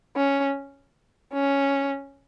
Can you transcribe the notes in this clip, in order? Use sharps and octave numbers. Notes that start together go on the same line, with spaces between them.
C#4
C#4